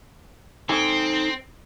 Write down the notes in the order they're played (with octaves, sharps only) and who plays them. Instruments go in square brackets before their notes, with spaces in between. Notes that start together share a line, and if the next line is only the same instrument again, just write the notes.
[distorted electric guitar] C4 [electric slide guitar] D#4 A4 G#5